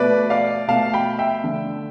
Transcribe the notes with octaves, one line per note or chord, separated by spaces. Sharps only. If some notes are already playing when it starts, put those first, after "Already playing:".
Already playing: B2 A3 B4 D5
D5 F5
B2 A3 F5 A5
G5 B5
E5 G5
D3 A3